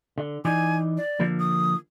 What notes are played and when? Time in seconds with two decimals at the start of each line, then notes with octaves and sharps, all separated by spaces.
0.18 D3
0.45 E3 D#4 D5 G#5
0.97 D5
1.20 D3 F3 A#3
1.40 D#6